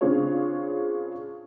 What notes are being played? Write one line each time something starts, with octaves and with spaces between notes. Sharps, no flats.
C#3 C4 D4 F4 G#4 C#5